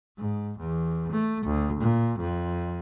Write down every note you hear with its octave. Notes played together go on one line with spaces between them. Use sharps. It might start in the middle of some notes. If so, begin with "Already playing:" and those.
G#2
E2
A3
D2
A#2
F2